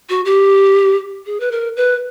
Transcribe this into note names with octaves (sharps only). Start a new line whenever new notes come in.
F#4
G4
G#4
B4
A#4
B4